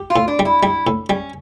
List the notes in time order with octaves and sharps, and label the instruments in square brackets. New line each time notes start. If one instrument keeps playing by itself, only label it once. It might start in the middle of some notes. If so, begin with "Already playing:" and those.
Already playing: [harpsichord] G4
[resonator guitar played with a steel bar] F4
[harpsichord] A2
[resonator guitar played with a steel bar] D4
[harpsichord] G3
[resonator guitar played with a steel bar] E4
[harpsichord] G3 [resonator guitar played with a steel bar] E4
[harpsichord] A2
[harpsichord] G3 [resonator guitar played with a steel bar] C#4